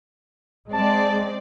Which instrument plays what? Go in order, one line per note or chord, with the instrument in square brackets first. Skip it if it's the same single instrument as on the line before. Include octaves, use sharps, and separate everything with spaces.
[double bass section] G#3 [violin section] C4 D5 [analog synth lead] A5